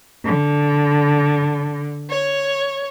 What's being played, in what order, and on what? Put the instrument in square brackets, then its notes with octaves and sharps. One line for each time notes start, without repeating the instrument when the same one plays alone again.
[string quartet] D3
C#5